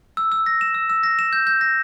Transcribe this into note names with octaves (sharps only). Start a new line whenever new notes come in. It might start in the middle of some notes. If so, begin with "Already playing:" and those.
E6
E6
A#6
E7
E6
E6
A#6
E7
G6
G6
A#6